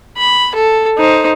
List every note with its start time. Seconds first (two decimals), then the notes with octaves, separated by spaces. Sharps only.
0.17 B5
0.55 A4
0.98 D#4 C5